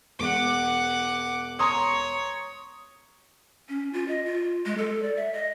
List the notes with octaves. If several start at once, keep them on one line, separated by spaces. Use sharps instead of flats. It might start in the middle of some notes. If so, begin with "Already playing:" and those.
E1 F#5 D6
C#5 A#5 C6 D#6
C#4
F4
D#5
F4
G#3
A4
D5
E5
D#5